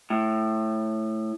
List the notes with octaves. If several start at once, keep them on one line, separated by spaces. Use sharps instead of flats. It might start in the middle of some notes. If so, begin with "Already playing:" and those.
A2